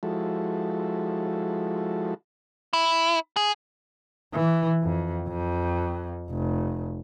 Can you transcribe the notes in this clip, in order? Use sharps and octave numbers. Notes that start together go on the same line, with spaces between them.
F3 G#3 E4 F#4 A4
E4
G#4
E3
F2
F2
F1